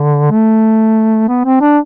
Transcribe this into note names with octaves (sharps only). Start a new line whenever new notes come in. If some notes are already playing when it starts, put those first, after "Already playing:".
Already playing: D3
A3
B3
C4
D4